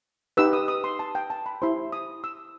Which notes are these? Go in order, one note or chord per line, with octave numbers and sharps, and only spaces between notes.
D#4 G4 B4 E6
D#6
D#6
C6
A5
G5
A5
B5
E4 G4 C5 C6
D#6
E6